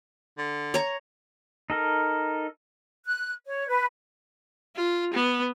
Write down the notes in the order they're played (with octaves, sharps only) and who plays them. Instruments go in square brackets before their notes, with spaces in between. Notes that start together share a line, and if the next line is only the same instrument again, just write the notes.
[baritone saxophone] D3
[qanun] C#5 A#5
[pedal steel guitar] D#4 A4 A#4
[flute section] F#6
C#5
B4
[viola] F4
B3